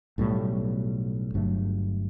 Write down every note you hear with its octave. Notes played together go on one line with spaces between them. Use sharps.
B1 A2 G3
G1 G2 F#3 A3